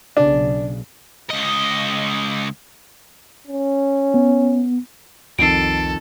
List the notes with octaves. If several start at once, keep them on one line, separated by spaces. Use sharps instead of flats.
B1 C#3 D4
C#2 D#5
C#4
B3
C2 F2 D#3 A4 C7 D7